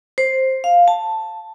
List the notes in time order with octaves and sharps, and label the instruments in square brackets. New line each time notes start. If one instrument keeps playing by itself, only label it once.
[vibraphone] C5
F5
A5